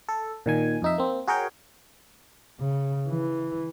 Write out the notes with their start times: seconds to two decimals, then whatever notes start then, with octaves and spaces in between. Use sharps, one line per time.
0.09 A4
0.46 A#2 D#3 G#5
0.82 F2 D#4 E5
0.98 A#3 C4
1.27 F#4 G#4 A#4 C#5 G5
2.59 C#3
3.09 E3